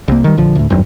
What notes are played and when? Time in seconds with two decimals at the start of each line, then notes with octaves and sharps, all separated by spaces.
0.08 C2 A#3
0.24 D#3 G3
0.37 A#1 D3 F3
0.55 D2 A2
0.70 G#1 E2 G2 F#3